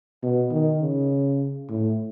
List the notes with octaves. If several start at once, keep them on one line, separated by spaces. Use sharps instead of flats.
B2
D#3
C#3
A2